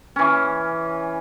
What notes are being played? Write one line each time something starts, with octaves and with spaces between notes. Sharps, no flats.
E3 C#4